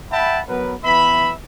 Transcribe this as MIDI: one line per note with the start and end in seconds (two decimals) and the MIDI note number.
0.12 0.41 76
0.12 0.41 78
0.12 0.41 79
0.12 0.41 81
0.12 0.41 83
0.48 0.75 54
0.48 0.75 59
0.48 0.75 70
0.48 0.75 71
0.84 1.32 52
0.84 1.32 59
0.84 1.32 76
0.84 1.32 83